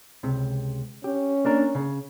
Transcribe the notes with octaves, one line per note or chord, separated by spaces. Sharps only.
C#2 C3
C#4 G4
A#3 D4 A#4
C#3